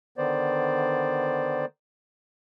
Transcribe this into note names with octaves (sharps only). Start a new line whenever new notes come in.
D3 D#3 B3 C5 D5